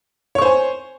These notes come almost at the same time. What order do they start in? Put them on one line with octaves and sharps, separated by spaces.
C#5 C#6 C5 G#5